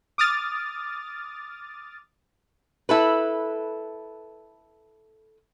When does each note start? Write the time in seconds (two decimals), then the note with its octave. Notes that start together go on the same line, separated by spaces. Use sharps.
0.18 D6 D#6 F6 A6
2.89 E4 A4 B4